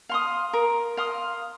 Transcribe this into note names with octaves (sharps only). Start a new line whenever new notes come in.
F5 C6 D#6
A#4
F5 C6 D#6